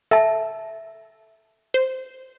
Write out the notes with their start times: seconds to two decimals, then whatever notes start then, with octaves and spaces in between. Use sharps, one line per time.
0.11 A4 E5 A5
1.74 C5